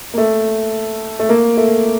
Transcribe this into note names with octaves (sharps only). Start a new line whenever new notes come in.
A#3
A3
A3
A#3
A3